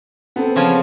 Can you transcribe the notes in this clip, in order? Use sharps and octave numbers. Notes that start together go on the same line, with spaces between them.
B3 C4 A4
C#3 F3 G#5